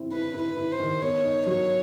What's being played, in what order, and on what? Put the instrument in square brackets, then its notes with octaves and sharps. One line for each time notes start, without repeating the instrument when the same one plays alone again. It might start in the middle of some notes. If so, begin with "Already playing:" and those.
Already playing: [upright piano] C4 E4
[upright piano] E4 [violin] B4
[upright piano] E4
[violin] B4
[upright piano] E4
[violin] C5
[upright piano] D#3
[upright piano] B3 [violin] C#5
[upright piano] D#4
[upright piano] F#3 [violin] C#5